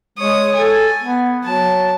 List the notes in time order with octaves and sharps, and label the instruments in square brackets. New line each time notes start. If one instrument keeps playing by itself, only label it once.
[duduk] G#3 [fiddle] C#5 D#6
[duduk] A4 [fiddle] G#5
[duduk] B3
[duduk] F#3 [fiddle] A5